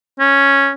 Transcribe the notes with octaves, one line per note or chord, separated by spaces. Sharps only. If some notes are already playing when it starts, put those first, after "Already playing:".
C#4